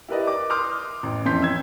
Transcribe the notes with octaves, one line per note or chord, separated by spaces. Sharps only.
E4 G4 A#4 B4 D5 D#5
D6
C6 D6 D#6 F6 G6
A1
F2 E3 C#4 C6 G6 B6
E6 G#6